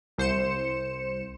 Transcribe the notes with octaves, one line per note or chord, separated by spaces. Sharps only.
C2 C5 C#7 E7